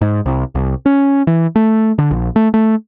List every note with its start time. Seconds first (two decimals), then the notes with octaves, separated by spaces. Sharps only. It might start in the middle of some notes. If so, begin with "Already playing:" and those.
0.01 G#2
0.26 C2
0.55 C2
0.86 C#4
1.27 E3
1.56 A3
1.98 D3
2.11 A#1
2.36 A3
2.54 A3